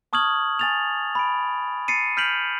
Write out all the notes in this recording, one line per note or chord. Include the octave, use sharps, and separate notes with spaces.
A5 C#6 D#6 F6 G#6 F#7
G#5 A6 F7
B5 D7
A6 C7 C#7 D#7
F6 G6 B6 D7 F7 F#7